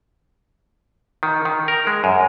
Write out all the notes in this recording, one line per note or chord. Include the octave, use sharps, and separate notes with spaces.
D#3
D#3
A#4
G#3
F#2